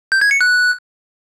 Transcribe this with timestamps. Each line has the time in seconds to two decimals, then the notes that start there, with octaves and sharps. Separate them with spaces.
0.12 G6
0.21 G#6
0.31 C#7
0.41 F#6